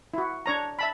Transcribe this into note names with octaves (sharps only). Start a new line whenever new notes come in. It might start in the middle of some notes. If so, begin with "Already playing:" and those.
E4 F#4
D4 C#5 A#5
E5 A5 B5